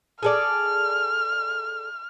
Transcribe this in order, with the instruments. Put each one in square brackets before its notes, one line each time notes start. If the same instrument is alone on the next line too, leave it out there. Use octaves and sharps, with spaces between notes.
[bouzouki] G#4 A4 D5 [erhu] F6